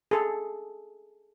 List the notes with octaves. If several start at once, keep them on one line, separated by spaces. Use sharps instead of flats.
G#4 A4